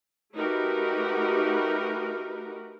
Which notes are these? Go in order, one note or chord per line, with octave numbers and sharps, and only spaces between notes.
A3 D#4 F#4 G4 A#4 B4